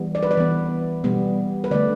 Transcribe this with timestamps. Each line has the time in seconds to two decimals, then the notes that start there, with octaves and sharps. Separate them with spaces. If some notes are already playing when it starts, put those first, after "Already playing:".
Already playing: E3 G3 B3
0.15 D5
0.23 B4
0.31 D5
0.37 E3 B3
1.04 B2 G3 B3
1.64 B4
1.71 D3 A3 D5